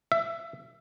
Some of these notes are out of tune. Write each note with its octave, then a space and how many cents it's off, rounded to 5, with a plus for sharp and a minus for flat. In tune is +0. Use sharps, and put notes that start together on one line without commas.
E5 +20